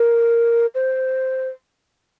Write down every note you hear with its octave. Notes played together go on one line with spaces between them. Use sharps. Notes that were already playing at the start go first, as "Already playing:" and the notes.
Already playing: A#4
C5